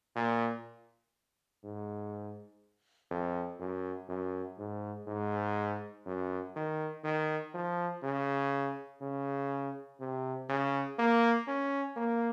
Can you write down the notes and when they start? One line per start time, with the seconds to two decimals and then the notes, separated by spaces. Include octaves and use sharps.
0.16 A#2
1.64 G#2
3.11 F2
3.60 F#2
4.09 F#2
4.58 G#2
5.07 G#2
6.06 F#2
6.56 D#3
7.04 D#3
7.54 F3
8.03 C#3
9.01 C#3
10.00 C3
10.49 C#3
10.99 A#3
11.48 C#4
11.96 A#3